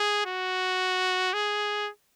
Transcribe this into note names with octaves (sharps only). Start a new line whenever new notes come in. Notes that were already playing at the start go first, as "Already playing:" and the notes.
Already playing: G#4
F#4
G#4